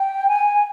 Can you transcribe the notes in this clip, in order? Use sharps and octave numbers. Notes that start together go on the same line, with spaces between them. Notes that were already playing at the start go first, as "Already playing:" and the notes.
Already playing: G5
G#5